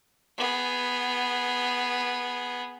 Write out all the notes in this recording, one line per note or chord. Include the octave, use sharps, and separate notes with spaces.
B3 G#4